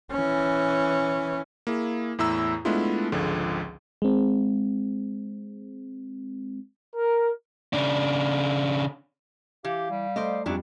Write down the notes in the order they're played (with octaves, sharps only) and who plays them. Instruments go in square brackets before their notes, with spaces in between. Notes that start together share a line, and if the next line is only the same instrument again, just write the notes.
[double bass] E3 C#4
[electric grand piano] A#3 E4 G#4
E2 A2 E4 A#5 E6
G#3 A3 B3 D4 E4 F4
G#1 C#2 D3 F3 G#4
[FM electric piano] G#3 C4
[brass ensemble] A#4
[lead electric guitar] C#3 D4
[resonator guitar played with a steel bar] E3 [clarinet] G4 [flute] F5
[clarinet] G3
[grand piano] A3 [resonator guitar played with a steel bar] C5 D5 D#5
[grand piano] F2 G3 [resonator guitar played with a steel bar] E3 F#3 D4